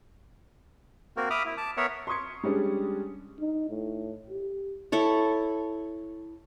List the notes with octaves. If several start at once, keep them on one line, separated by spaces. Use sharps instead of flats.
A#3 C4 F#4 A#4
E5 B5 D6 D#6 F6
E4
A5 D6
B3 A#4 C#5 E5 F#5
C6 C#6 D#6 G#6 C#7
G3 G#3 C#4 D4
D#4
A2
G4
E4 A4 C#5